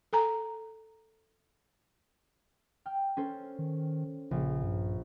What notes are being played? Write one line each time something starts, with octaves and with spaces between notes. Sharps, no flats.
A4 G#5 A#5
G5 F6
C#4 A4 C5
D#3
A#1 C#3
G2